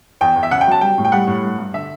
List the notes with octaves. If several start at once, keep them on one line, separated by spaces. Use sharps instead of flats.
E2 G5
E2
E5
C#3 F#5
G5
F#3 A5
G3 G5
A2
G5
G3 F#5
A2
G2
G2
D3 E5